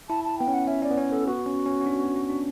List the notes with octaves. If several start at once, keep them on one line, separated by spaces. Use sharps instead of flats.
E4 A5
A5
B3 G5
C#4
F#5
C#4 E5
C#4 D5
B3
C#4 C#5
B3 A4
B3 F#4
C#4
C#4
C#4
D4
B3
C#4
D4